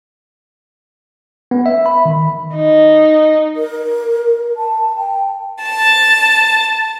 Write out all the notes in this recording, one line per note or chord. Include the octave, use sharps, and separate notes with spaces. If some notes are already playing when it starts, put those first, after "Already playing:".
B3
E5
B5
D#3
D#4
A#4
A5
G5
A5